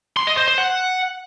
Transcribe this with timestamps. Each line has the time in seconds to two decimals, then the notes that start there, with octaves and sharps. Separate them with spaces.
0.17 C6
0.27 D#5
0.37 C5
0.48 C5
0.58 F#5